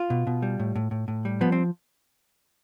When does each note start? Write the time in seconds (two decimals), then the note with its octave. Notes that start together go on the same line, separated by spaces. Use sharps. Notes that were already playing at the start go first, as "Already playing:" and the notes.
Already playing: F4
0.10 B2
0.27 B2
0.42 G3
0.60 A2
0.76 A2
0.91 A2
1.08 A2
1.25 G3
1.41 F3 B3
1.52 C4